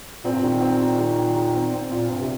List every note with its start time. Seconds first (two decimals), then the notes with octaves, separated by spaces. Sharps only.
0.24 A#2 C4
0.32 G2
0.40 A#2 D#3
0.61 C4
0.81 D#3
0.98 D#3
1.17 D#3
1.35 D#3
1.54 C4
1.73 C4
1.91 A#2 F4
2.10 G2 C4
2.19 C3